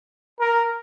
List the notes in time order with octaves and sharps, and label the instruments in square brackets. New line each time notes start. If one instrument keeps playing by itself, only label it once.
[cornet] A#4